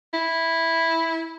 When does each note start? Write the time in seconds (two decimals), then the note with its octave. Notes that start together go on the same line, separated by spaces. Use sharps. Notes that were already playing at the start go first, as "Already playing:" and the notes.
0.14 E4